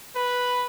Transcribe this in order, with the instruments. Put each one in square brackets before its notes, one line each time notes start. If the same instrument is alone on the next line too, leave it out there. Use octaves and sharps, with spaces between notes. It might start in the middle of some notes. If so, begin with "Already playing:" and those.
[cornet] B4